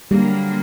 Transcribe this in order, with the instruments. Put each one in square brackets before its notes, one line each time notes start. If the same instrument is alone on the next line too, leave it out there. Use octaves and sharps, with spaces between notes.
[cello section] D3 F#3 A#3 [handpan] G3